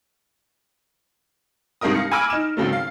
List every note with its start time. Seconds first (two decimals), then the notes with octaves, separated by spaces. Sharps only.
1.81 C2 G2 G#3 D#4 A#4 D#6
1.94 F5 A#6 C#7
2.12 G#5 B5 D6 E6 F6 D7
2.30 D#4 E7
2.57 G#1 C#2 F#3 A3
2.73 F5